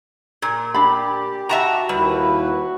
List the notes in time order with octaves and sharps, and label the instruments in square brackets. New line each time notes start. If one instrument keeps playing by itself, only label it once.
[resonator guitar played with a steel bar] A#2
[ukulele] D4 D5 B5 [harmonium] G4
[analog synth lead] F#4 [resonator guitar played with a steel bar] E5 A5 A#5
[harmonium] D#2 E4 B4 [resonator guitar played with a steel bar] G3